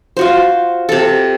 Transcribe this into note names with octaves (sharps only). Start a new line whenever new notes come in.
F4 F#4 C5
C3 A4